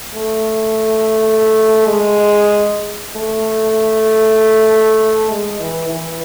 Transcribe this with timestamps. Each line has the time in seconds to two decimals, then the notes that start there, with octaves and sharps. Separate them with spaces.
0.15 A3
1.87 G#3
3.16 A3
5.31 G#3
5.59 E3
5.89 E3